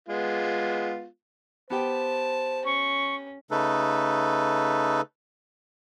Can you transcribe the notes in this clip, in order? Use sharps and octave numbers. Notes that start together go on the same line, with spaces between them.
G#3 B3 F4
B3 G4 C5 G5 A5
C#4 C#6
C#3 A3 D#4 A4 B4